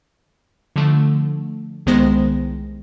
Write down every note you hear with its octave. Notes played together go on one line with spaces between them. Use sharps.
D3 F3 A3
C2 D#3 G#3 B3 C5 A#6